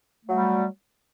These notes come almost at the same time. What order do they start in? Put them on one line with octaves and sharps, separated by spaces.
A3 F#3 G3